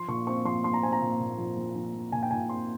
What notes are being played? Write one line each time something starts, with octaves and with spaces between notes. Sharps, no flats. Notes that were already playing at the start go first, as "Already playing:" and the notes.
Already playing: F3 C6
A#2 C#6
C4 C#6
F3 C6
F3 C6
A#5
C4 G#5
A#5
A#2
A#2
F3
F3
F3
F3
A#2 G#5
G5
A#2 G#5
C4 C6